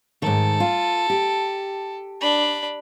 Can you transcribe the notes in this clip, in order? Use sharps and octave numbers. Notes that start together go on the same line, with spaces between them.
G#2 D#3 A4
F4
G4
D4 B5